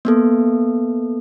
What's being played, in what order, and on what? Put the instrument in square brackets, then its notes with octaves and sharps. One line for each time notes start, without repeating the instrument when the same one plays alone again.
[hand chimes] A#3 B3 A4